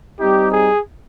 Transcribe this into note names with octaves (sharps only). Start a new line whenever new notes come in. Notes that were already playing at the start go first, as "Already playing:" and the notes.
G3 C4 D#4 G4
G#4